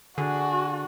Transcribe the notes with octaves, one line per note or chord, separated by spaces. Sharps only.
D3 D4 F#4 G#4